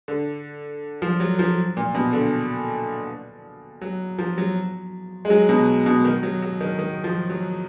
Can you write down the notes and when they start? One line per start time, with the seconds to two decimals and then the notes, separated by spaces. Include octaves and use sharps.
0.08 D3
1.02 F3
1.20 F#3
1.39 F3
1.77 A#2
1.95 B2
2.13 D3
3.81 F#3
4.18 F3
4.38 F#3
5.25 G#3
5.30 F#3
5.49 B2
5.86 B2
6.05 D#3
6.23 F#3
6.42 F#3
6.61 D#3
6.79 D#3
7.04 F3
7.30 F#3